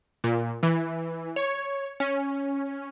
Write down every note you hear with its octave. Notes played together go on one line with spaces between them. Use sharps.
A#2
E3
C#5
C#4